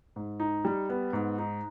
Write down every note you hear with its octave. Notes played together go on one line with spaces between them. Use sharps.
G#2
D#4
G3
B3
G#2
D#4